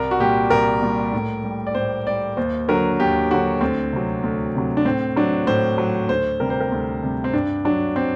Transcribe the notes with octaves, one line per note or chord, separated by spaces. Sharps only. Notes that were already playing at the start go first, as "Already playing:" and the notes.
Already playing: C2 A#4
F#4
A#2 G3 G4
C2 A#4
A#2 G3
A2
G3
D5
A2 C5
G3 D5
D#2 C5
D3 F#3 A#4
D#2 G4
D3 F#3 F#4
D2 C4
C3 F#3
D2
C3 F#3
D4
A2 C4
F#3 D4
A2 C5
F#3
D2 C5
C3 G3 A#4
C5
A#4
D2
C3 G3
C4
G2 D4
F#3 D4
C4